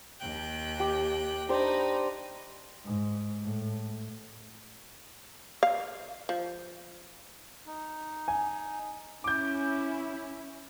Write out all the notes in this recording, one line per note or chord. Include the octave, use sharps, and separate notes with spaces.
D#2 G5 F#6
G4
D4 D#4 G4 C5 B5
G#2
A2
F5
F3
D#4
G#5
C#4 E4 D6 G6